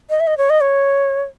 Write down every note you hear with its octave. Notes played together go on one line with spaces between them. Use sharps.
D#5
E5
D#5
C#5
D#5
C#5